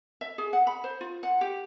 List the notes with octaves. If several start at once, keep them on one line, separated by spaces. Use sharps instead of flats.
E5
G#4
F#5
B5
C5
F4
F#5
G4